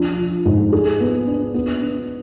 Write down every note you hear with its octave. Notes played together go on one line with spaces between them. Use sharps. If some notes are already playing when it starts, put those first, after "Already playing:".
Already playing: F3 D4
F3
G#2
G#4
B3
D4
B3
D4